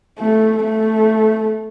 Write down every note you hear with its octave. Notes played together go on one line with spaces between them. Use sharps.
A3
A3